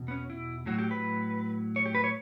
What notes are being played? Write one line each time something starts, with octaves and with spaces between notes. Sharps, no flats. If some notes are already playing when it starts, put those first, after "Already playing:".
Already playing: E2 B2
B3
C#4
E4
A2 F#3 F#4
G4
B4
C#5
G4
B4
C#5